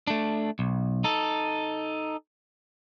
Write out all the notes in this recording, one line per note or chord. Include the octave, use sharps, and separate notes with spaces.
A3 D4
B1
D#4 A4